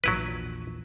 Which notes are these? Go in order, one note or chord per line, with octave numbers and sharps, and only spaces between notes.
A#1 E2 F#3 E4 B4